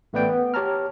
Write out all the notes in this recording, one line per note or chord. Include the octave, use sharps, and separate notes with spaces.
A1 A3 B3 B4 D5 G5
B3
G4 C#5 A5 A#5 F6